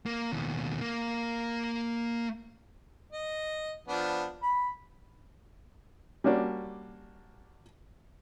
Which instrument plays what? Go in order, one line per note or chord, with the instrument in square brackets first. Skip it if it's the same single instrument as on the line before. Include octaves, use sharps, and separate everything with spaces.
[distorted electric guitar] A#3
D#2 B2
A#3
[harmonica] D#5
F3 B3 D4
B5
[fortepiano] G3 A#3 C#4 D4 F#4